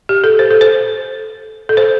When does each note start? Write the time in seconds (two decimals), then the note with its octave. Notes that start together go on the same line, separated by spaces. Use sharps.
0.09 G4
0.24 A4
0.39 C5
0.51 A4
0.61 C5
1.69 A4
1.77 C5